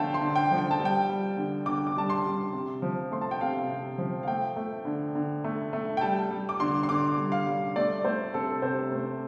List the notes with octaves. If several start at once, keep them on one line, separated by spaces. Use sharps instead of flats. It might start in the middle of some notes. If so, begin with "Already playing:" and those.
Already playing: D3 F3 A3 C5 F5 G5 A5
C6
D3
G5
F3
G5
A5
G3
G5
G3
D3
D3 D6
D6
G3 A5
C6
G3
C3
F3
A3 C6
A5
G5
C3 F5
C3
F3
F5
A3 G5
A3
D3
D3
A3
A3
G5
G3 A5
G3
D6
D3 C6
C6
D3 D6
G3
F5
G3
A3 D5
A3 C5
C3 A4
C3 C5
A3